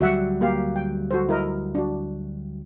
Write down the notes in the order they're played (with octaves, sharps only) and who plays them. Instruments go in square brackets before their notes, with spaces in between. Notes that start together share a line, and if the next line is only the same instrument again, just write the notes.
[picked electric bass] D2 F#3 G3 [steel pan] F#4 E5 F#5
[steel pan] A#3 G4 F5
G5
F#4 A4 C5
E4 A#4 D#5
D4 F#4